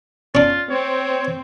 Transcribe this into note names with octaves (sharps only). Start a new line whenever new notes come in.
C#4 D4 F4
C4 C#5